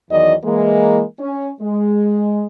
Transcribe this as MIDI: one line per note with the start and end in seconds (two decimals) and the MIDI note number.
0.10 0.34 40
0.10 0.34 51
0.10 0.34 52
0.10 0.34 54
0.10 0.34 74
0.10 0.34 75
0.44 1.02 52
0.44 1.02 56
0.44 1.02 58
1.19 1.49 61
1.61 2.45 56